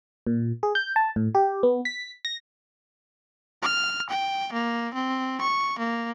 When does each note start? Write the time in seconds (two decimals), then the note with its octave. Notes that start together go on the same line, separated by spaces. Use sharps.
0.27 A#2
0.63 G#4
0.75 G6
0.96 A5
1.16 A2
1.35 G4
1.63 B3
1.85 B6
2.25 A#6
3.62 F6
4.10 G5
4.53 A#3
4.94 C4
5.41 C#6
5.79 A#3